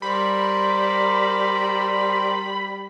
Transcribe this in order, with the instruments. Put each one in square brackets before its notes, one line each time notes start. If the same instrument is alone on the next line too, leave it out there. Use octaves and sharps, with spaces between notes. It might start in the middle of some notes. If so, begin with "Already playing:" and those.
[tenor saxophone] G3 [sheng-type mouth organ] A#4 C5 D5 [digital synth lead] B5